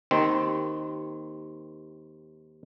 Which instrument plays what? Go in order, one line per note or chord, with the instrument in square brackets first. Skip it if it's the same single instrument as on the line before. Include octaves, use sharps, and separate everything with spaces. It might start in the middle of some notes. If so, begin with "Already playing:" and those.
[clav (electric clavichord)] D#2 D#3 C4